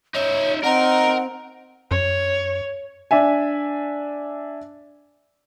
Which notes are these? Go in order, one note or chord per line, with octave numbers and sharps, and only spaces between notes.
D#4 C#5 E5
C4 D#4 A#4 F#5
F#2 C#5
D4 E5 G#5